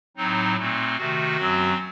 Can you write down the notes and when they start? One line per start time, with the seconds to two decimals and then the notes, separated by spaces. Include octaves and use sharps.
0.17 A2 F#3 C4 D#4
0.56 A#2 A3 C4
0.97 C3 D#3 A3 F#4
1.37 F#2 F#3 C4